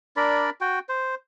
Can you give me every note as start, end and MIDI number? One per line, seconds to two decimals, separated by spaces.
0.16 0.50 62
0.16 0.50 70
0.16 0.50 74
0.16 0.50 83
0.61 0.79 66
0.61 0.79 79
0.89 1.15 72